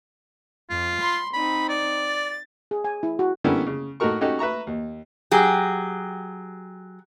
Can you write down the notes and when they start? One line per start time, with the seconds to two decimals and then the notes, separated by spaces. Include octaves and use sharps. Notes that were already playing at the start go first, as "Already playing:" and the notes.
0.70 F2 F4
0.99 B5 C6
1.33 C4 D#4 B5
1.69 D5
2.06 A6
2.71 G#4
2.84 G#5
3.03 E4
3.19 F#4
3.44 D3 G3 A#3 B3 C#4 E4
3.66 C#3
4.00 A2 A3 D#4 F#4 A#4 C#6
4.21 C#4 D#4 F#4 G4 A4
4.39 B4 E5 A#5 C#6
4.67 D#2
5.31 F#3 G4 G#4